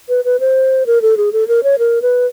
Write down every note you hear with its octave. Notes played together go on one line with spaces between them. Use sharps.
B4
B4
C5
A#4
A4
G#4
A4
A#4
C#5
A#4
B4